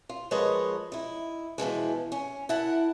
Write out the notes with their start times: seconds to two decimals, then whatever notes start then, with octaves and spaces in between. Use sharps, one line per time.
0.09 F4
0.31 F3 G#3 A#4 B4 C#5 D#5
0.92 D#4 E4
1.58 B2 E3 F3 G#3
2.12 C#4
2.49 E4 A#4 F#5 A5